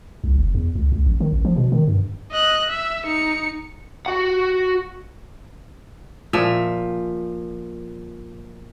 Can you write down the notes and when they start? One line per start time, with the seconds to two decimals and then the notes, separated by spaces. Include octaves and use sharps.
0.24 C2
0.38 F#1
0.54 E2
0.75 C#2
0.92 C#2
1.06 A1
1.20 D#3
1.32 A1
1.45 F3
1.56 B2
1.72 D#3
1.88 G2
2.32 D#5 F#6
2.70 E5
3.06 D#4 C#7
4.06 F#4 F#5
6.33 A#2 F3 E5